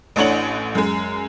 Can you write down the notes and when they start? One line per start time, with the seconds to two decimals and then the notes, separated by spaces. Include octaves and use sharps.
0.16 A1 A2 D4 C#5 F#5 F#7
0.75 F#2 G#3